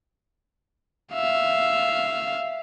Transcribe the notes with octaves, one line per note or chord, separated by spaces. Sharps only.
E5 F5